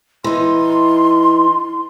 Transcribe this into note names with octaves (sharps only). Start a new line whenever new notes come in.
E3 D#4 C6